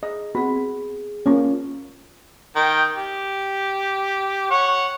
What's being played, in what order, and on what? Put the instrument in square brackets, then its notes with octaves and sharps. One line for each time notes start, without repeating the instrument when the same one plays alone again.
[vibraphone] G#4 [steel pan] D#5
[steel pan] B3 F#4 B5 [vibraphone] C4 G#4
[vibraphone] G#4
[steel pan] A#3 C#4 [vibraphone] F4
[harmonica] D#3 G5
G4
C#5 F#5